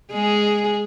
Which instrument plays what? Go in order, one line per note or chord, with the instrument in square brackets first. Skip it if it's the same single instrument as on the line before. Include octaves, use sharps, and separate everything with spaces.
[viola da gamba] G#3 G#4